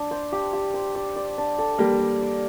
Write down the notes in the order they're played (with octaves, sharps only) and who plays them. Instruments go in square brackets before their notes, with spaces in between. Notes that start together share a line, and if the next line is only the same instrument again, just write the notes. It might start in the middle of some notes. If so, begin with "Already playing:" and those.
Already playing: [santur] D4
C5
G4
G4
C5
D5
D5
D4
A4
[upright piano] G3 A#3 [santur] D5
[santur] D5
D5